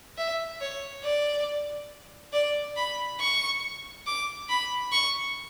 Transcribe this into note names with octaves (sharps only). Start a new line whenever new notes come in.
E5
C#5
D5
D5
B5
C#6
D6
B5
C#6